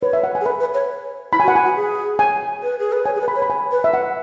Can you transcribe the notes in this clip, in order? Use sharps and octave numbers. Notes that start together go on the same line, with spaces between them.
B4 C#5
E5
F#5
G#5
G#4
B4 B5
B4
C#5
E4 B5
G#5
F#4
F#5
G#5
F#4
G#4
G#5
B4
G#4
B4
C#5 G#5
G#4
B4
B5
C#5
B5
G#5
B4
E5
F#5